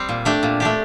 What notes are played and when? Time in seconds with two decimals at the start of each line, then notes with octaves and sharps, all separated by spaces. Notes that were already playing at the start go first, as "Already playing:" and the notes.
Already playing: G3 C4
0.09 A#2
0.25 A3 D4 G4
0.43 A#2
0.60 A3 D4 G4